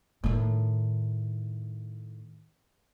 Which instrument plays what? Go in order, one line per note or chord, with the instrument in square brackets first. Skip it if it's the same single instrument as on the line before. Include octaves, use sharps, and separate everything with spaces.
[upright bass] A2 D#3